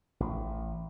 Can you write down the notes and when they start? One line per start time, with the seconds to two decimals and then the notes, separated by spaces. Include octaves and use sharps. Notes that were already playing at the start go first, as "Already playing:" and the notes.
0.20 A1